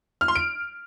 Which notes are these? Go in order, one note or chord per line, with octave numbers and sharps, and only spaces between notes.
F6
C6
D7